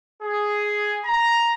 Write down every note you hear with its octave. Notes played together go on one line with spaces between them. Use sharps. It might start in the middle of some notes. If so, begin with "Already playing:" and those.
G#4
A#5